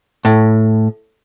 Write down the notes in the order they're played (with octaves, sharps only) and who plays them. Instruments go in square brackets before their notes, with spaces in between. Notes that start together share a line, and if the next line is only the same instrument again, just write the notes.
[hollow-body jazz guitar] A2